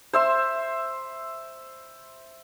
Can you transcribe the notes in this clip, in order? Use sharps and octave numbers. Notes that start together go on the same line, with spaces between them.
C5 E5 C6